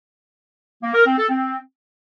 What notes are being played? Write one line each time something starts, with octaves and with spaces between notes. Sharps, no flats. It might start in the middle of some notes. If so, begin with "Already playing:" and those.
A#3
A#4
C4
A4
C4